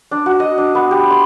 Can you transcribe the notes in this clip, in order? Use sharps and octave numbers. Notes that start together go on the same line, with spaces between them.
D4
F#4
D#5
D4
B3
G4
C6